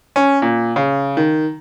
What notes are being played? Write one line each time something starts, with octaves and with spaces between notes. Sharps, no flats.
C#4
A#2
C#3
D#3